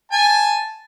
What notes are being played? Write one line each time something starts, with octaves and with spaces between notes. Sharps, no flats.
G#5 A5